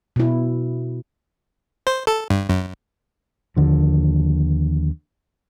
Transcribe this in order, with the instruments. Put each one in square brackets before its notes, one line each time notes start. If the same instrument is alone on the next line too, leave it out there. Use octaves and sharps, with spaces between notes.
[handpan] B2 E4
[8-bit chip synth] C5
A4
G2
F#2
[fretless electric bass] D#2 D3 F3